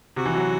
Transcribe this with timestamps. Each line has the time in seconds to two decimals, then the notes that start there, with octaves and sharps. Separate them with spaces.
0.17 C3 F#4
0.26 E3
0.36 F#3